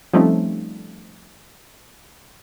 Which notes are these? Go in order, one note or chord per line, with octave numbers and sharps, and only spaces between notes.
F3 G3 A3 C4 C#4 D#4